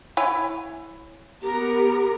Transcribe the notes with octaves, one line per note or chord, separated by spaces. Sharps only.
E4 C#5 G#5
B3 G4 A#4 A#5